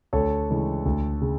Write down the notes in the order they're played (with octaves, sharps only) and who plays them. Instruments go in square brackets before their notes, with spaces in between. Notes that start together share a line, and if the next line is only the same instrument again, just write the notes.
[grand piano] D2 A4 C#5
C#3 E3 G#3
D2
C#3